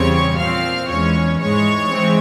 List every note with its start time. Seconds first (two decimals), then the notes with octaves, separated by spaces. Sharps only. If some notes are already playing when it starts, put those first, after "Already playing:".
Already playing: E2 C#3 G3 C4 C#5 C#6
0.38 A#2 F3 C4 F5 F6
0.89 E2 E3 G#3 C#4 C#5 C#6
1.40 G#2 E3 G#3 C#5 C#6
1.91 E3 G#3 C4